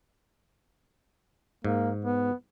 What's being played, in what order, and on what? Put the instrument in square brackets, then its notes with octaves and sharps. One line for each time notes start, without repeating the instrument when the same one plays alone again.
[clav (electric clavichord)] G#2 [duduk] A#3
[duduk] B3